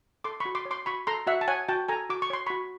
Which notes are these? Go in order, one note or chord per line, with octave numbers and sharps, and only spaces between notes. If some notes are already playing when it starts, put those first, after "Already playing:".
A4 C6 D6
B5 C#6
F#4
C6 D6
C#5
C6 D6
F#4 B5 C#6
A4 A#5 C6
F#4 E5 F#5
A5
C#5 F#5 G#5
F#4 G5 A5
A4 G#5 A#5
F#4 D6
C#6
C#5 C6
F#4 B5 C#6